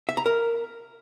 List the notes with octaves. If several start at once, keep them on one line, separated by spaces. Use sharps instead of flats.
E5
A#5
A#4